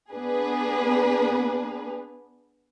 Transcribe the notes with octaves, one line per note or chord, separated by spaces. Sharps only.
B3 D4 G#4 B4